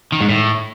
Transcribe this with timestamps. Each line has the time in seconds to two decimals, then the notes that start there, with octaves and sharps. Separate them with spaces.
0.12 D#3
0.21 G#2
0.29 A2